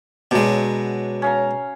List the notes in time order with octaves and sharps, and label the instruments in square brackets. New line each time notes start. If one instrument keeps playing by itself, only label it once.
[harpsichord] B2 G#3 [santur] F#3 D4
[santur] C#4 F5 A#5